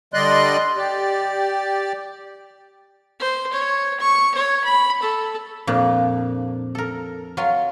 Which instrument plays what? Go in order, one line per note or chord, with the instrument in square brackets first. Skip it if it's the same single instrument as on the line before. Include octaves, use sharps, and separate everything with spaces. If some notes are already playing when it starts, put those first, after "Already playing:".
[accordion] D3 G3 D5 D#5 C6 F#6
G4 D5
[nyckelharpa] C5
C#5
C#6
C#5
B5
A4
[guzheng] F2 A#2 D4
A4 A#4
F#3 F4 C6